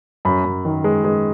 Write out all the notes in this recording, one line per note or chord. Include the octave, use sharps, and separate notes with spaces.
F#2 B5
F#2
D#3
G#3
G#3